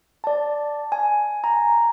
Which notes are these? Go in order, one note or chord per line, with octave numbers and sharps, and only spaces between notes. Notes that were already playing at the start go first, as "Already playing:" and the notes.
D5 A5
G#5
G#5 A#5